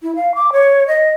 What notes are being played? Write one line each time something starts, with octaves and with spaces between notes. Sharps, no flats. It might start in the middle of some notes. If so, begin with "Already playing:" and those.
E4
F5
D6
C#5
D#5